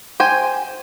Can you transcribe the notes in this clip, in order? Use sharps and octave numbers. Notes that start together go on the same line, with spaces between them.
C5 G5 G#5